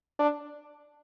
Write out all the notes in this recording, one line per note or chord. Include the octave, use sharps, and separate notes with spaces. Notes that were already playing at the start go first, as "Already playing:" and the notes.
D4